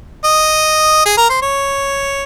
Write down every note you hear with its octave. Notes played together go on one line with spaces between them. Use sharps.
D#5
G#4
A#4
C5
C#5